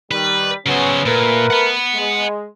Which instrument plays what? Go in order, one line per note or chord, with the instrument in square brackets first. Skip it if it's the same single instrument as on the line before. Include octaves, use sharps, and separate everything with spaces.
[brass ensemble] D#3 G3 [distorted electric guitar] B4
[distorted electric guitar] C#3 C5 [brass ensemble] F#3 B3 C#4
[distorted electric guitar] A#2 [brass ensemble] A3 A#4 B4
[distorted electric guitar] F#5 B5
[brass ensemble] G#3